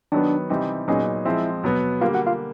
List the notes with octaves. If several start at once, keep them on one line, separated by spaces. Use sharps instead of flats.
D#3 F#3 B3 D4 D5
C3 E3 G3 C4 D#4
A#2 F#3 B3 C#4 D#4 G#4 C#5
F3 G#3 C4 E4 E5
B2 F#3 B3
D3 G3 A#3 F4 F5
F#4 F#5
F4 F5